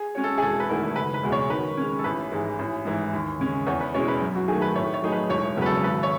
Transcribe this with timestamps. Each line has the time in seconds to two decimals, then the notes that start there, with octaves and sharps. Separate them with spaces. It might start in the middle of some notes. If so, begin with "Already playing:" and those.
Already playing: G#4
0.15 G#3 C#4 F#4 C#5
0.24 A4
0.38 G#4
0.42 E1 A4
0.60 B4
0.69 E2 D#3 A3 E4
0.96 F#1 B4
1.14 B4
1.23 E2 B2 G#3
1.32 C#5
1.50 D#3 B4
1.77 G#3 C#4
1.99 A4
2.04 A1 B4
2.32 G#2 E3 G#3
2.59 A1
2.85 G#2 E3
3.13 D#2
3.40 C#3 G#3 C#4
3.67 E2 C#5
3.80 B4
3.94 B2 G#3 C#4 E4 C#5
4.08 B4
4.21 F#2
4.35 F#4
4.48 D#3 A3 G#4
4.62 B4
4.75 A2 C#5
4.94 C#5
5.02 F#3 A3 D#4 G#4
5.12 B4
5.30 E1 C#5
5.57 E2 C#3 F#3 B3 B4
5.66 A4
5.83 G#1 B4
6.03 C#5